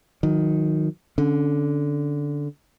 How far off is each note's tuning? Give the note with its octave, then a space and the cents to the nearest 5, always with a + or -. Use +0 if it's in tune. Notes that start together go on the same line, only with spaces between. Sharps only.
D#3 +0 F#3 -30
D3 -10 C#4 -10